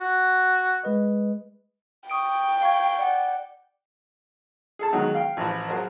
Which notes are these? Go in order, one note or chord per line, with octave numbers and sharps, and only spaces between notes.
F#4
G#3 B4 D#5
G5 C#6 D#6 D7
F5 C#6 G#6
D5 F#5
G#4 A4 A5
B2 D#3 F#3 G#3
F5 G5
A1 E3 F3
F3 F#3 G#4 A#4 C5